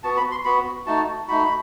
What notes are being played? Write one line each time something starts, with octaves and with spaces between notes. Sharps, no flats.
B3 F#4 A5
B5
C6
B3 F#4 B5
A3 D#4 F#4 A5
A3 D#4 F#4 B5